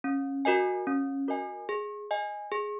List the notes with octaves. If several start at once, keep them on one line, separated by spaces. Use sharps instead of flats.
C#4
F#4 A#4 D#5 G#5
C#4
F#4 A#4 D#5 G#5
G#4
D#5 G#5
G#4